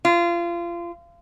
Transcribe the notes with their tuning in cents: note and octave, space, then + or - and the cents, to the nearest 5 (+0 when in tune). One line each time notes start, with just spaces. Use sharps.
F4 -25